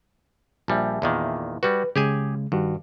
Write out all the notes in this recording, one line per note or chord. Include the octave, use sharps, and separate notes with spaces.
A#1 G3 E5 G#5 A5
E2 A#2 D#3
G3 F#4 B4
C#3 G#3 G4 G#4 G#5
G2 D#3 G3 F#4